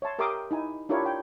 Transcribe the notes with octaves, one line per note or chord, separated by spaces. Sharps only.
C#5 E5 A5 C6
G4 A#4 E5 C6 D6 D#6
D#4 E4 G#5
D4 E4 F4 G4 A#4 C#5
C#5 G5